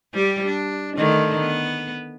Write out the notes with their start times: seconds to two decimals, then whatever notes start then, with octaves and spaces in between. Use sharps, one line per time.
0.14 G3 G4
0.46 D4
0.97 D3 D#3 A3
1.40 B3